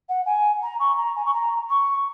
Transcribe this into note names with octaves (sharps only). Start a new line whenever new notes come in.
F#5
G#5
A#5
C#6
A#5
G#5
C#6
A#5
C#6